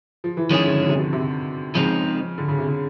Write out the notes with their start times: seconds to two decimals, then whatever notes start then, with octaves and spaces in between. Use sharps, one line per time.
0.24 F3
0.37 E3
0.49 D#3 F3 G#3 C#4 E4 G#4
0.66 D3
0.81 D3
0.89 C3
0.96 B2
1.13 C3
1.74 C#3 F3 G#3 C4 D#4
2.38 D3
2.48 C#3
2.58 C3
2.68 C#3